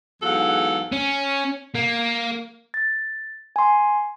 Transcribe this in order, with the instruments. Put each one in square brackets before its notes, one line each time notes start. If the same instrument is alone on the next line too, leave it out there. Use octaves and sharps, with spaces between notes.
[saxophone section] E2 G#2 F#3 A4 F5 F#5
[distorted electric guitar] C#4
A#3
[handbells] A6
G#5 C6